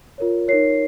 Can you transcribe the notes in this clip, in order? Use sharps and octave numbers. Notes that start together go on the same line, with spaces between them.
F4 A#4 C#5
D#4 A#4 C#5 C7